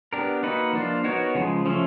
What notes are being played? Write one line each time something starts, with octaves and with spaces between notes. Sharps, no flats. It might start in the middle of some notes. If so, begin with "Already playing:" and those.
B3 D4 G4 A#4
A#3 D#4 F#4 B4
F3 A#3 D4 F4
B3 D#4 F#4 A#4 C#5
C#3 F3 G#3
F3 A3 C#4